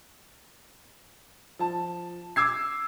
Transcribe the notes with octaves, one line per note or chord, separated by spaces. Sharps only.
F3 A5
D6 E6 G#6 C7